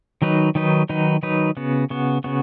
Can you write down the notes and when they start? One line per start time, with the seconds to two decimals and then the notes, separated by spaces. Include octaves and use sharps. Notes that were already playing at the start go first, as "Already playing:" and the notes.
0.22 D#3 F#3 D#4 B4
0.55 D#3 F#3 D#4 B4
0.89 D#3 F#3 D#4 B4
1.23 D#3 F#3 D#4 B4
1.57 C#3 B3 F#4
1.90 C#3 B3 F#4
2.24 C#3 B3 F#4